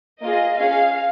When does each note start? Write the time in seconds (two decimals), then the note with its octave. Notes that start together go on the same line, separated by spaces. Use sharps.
0.21 A#3 F4 G#4 D#5
0.59 C#4 G#4 F5